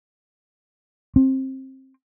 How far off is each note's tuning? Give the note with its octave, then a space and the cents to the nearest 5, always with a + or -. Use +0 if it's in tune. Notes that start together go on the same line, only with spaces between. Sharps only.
C4 +20